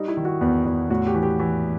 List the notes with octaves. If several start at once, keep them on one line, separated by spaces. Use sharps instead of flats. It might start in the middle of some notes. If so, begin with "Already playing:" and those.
Already playing: G3 D#4
E4
D#3
F#4
E2 B3
E2
A2 F#4
G4
E3
G4
E3